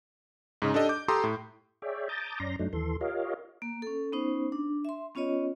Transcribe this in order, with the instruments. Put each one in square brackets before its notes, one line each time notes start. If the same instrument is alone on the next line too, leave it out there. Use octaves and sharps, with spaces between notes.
[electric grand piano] G#2 C#3 D#4
D4 G4 A4 D#5
D6 G6
G4 A4 A#5 C6 D6 D#6
A2
[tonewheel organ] G#4 C#5 D5 E5 G5
A5 A#5 D6 D#6 G6 A6
F#2 C#4 D5 A#5 C6 A#6
F#2 F#3 A3 D4 D#4
D#2 E3 A4 C6
F4 G4 A#4 C#5 D#5 F5
[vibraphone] A#3
C#4 A4
B3 C#4 D#4 C5
D4
E5 C6
B3 C#4 F4 C#5 D#5